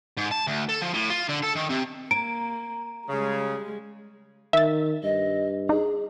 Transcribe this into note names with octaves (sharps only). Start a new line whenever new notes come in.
G#2
A5
D2
A4
F3
A2
F4
D3
A4
D#3
C3
A#3 A#5 D7
C#3 G3 G#3
D#3 E5 A6
G2 D#5
D#4 G#4